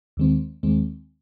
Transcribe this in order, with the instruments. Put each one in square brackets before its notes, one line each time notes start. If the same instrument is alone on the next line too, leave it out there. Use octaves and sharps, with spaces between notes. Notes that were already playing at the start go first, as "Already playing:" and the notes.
[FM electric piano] D#2 D#3 G#3 C4
D#2 D#3 G#3 C4